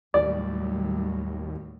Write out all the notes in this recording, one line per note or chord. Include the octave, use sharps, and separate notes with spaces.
D#2 A2 F#3 G3 D5